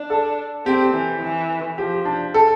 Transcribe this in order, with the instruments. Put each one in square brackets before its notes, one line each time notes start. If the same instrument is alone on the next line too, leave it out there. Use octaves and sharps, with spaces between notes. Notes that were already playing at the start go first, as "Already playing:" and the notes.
Already playing: [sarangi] D4
[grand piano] A4
[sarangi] C4 [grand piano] G4
[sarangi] E3
E3
[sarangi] F3 [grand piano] G4
[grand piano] D4
A4